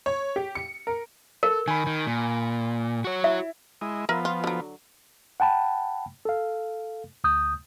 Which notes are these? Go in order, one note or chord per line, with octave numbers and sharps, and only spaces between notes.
C#5
G4
C#7
A#4
A4 A#4
D#3 G#5 B5
D#3
A#2
F#4 C#5
E4 E5
G#3 E4 D#5
F3 B3 A#4 B4 E5
F4
D3 F#3
F#5 G5 A5 B5
A4 F5
D2 D#6 G6